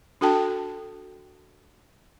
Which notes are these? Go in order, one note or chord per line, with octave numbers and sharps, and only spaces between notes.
D4 F#4 A4 G5 A5